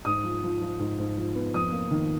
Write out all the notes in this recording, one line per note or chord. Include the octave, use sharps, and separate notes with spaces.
G#2 D#6
F3
F3
F3
G#2
G#2
F3
B3
F2 D#6
A#3
D#3